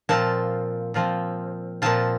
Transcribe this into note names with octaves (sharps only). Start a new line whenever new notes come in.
A#2 F3 C4 F4 A5
A#2 F3 C4 F4
A#2 F3 C4 F4 A5